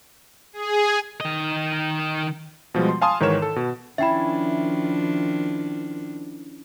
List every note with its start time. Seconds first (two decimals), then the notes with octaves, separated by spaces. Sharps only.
0.53 G#4
1.21 D#3 D#5
2.74 B2 F3 G3 G#3
2.89 C6
3.02 F5 G#5 A5 C6 D#6
3.20 G#2 D#3 E3 A#4 C#5 E7
3.42 A4
3.56 B2
3.98 D#3 F3 C#4 D4 E4 E5 G5 B5